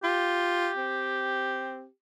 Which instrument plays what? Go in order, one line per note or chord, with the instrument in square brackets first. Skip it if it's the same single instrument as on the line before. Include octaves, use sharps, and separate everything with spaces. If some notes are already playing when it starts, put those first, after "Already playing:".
[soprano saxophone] F4 [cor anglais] G4
[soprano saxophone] C4